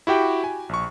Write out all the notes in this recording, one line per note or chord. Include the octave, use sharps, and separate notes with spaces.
E4 F#4 G4 G5
G#5
A#1 C#6